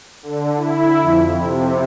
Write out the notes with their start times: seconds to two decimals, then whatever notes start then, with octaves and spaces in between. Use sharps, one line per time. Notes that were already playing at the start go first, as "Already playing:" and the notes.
0.23 D3
0.57 E4
1.02 F2
1.40 C3